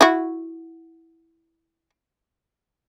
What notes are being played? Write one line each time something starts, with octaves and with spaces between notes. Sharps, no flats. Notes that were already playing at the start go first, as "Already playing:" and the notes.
E4 F#4